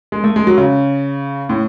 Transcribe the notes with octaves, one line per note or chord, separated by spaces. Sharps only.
G#3
A3
G#3
F#3
C#3
A2